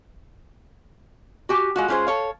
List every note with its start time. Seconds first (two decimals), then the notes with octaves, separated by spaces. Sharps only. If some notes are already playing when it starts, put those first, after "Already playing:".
1.49 F#4 G4 G#5
1.76 G#3 F4 F#4
1.88 G#3 C#4 F4 G#4 C5
2.07 A4 C#5 F5